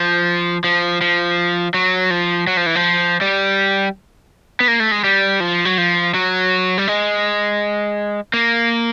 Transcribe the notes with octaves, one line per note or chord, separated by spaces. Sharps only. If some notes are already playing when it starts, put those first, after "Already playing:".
Already playing: F3
F3
F3
F#3
F3
F#3
F3
E3
F3
G3
B3
A#3
A3
G#3
G3
F3
F#3
F3
F#3
G3
G#3
A#3